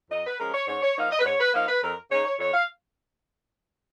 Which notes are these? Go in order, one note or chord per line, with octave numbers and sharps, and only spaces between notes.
F2 D#5
B4
F3 G#3 C#4 A#4
C#5
G#2 C#5
C#5
F3 A#3 D#4 F5
D#5
B4
G#2 C#5
B4
F3 A#3 D#4 F5
B4
F2 A#4
C#3 G#3 D#4 C#5
C#5
F2 C#5
F5